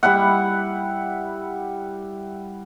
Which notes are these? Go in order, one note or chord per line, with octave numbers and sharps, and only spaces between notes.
G3 E4 E5 F#5